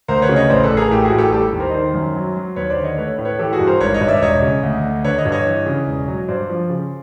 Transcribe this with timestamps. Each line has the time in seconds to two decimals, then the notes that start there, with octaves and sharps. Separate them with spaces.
0.08 D2 A#4 C5
0.22 B4 C#5
0.29 C#3
0.36 C#5 D#5
0.50 A1 C5 D5
0.64 A4 B4
0.70 A1
0.77 G#4 A#4
0.91 A2 G4 A4
1.05 F#4 G#4
1.11 A1
1.18 G4 A4
1.32 G3 G4 A4
1.53 D#2
1.60 A#4 C5
1.70 D#5
1.74 D#3 C5 D5
1.94 F#2
2.15 F#3
2.36 F#3
2.56 D#2 B4 C#5
2.70 C5 D5
2.77 D3
2.84 C#5 D#5
2.98 A3 B4 C#5
3.18 A2
3.25 B4 C#5
3.39 E3 G4 A4
3.53 F#4 G#4
3.60 G2
3.66 A#4 C5
3.80 G#1 B4 C#5
3.94 C#5 D#5
4.01 G2
4.08 D5 E5
4.22 E1 C#5 D#5
4.42 C#3
4.63 D2
4.84 D3
5.04 D3 B4 C#5
5.18 C#5 D#5
5.25 G2
5.32 C#5 D#5
5.46 E3
5.66 C#3
5.87 E1
6.08 F#3
6.28 G2 C5 D5
6.49 F3
6.70 C#3